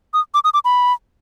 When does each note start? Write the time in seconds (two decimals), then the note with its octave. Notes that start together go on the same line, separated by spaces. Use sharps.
0.14 D#6
0.34 D6
0.44 D#6
0.54 D6
0.65 B5